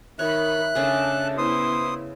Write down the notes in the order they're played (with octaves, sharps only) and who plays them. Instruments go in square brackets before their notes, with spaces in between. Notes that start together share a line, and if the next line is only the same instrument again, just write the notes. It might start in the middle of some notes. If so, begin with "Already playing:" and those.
[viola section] D#3 B5 [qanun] C#5 [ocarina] E5 [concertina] F#6
[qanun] C#3 A3 G#4 [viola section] D4 A4 A5
[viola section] B3 E4 C5 [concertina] C6 D#6